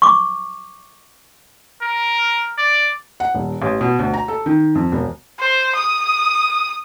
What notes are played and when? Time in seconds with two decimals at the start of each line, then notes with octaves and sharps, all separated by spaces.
0.02 C#6 D6
1.82 A#4
2.58 D5
3.20 F#5
3.35 D#1
3.62 A1
3.81 B2
3.99 D2
4.14 A#5
4.28 A4
4.46 D#3
4.75 F2
4.92 E1
5.40 C5
5.75 D#6